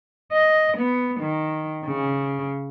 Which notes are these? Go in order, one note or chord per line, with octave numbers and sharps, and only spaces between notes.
D#5
B3
D#3
C#3